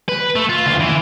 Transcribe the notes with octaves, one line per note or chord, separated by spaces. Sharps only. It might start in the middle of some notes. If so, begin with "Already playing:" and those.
B4
A3
F4
D2 F4
E3